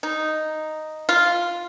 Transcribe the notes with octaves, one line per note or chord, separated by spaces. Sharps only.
D#4
F4